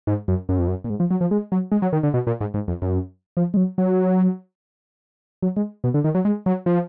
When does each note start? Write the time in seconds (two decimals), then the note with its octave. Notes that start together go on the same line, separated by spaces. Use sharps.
0.07 G#2
0.28 F#2
0.49 F#2
0.59 F2
0.68 F#2
0.84 A#2
0.90 G#2
1.00 F3
1.11 F#3
1.21 F3
1.31 G#3
1.52 F#3
1.72 G#3
1.82 F#3
1.93 D#3
2.03 D3
2.14 B2
2.27 A#2
2.41 G#2
2.54 G#2
2.68 F2
2.82 F#2
3.37 F3
3.54 G#3
3.57 F#3
3.78 F#3
5.42 F#3
5.56 G#3
5.84 B2
5.94 D3
6.04 D#3
6.15 F#3
6.25 G#3
6.46 F#3
6.66 F3